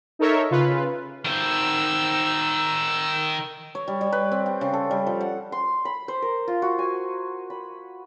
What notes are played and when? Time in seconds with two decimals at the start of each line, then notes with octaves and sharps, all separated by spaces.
0.19 D#4 A4 A#4 C#5 E5
0.51 C#3 F4 B4
1.25 D#3 C5 E6
3.75 C#5
3.88 G3
4.01 G3
4.12 B4
4.32 C4
4.46 G5
4.61 C#3
4.74 A4
4.91 G3
5.07 F3
5.21 F#5
5.52 C6
5.85 B5
6.08 C5
6.22 A#4
6.48 F4
6.62 F#4
6.79 G#5
7.50 B5